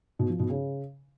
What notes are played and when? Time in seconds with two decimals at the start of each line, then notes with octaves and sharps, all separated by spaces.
0.19 B2
0.29 F3
0.40 B2
0.50 C#3